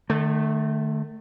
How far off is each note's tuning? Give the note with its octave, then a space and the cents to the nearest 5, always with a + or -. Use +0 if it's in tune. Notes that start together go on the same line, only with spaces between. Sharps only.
D#3 -45 A3 +0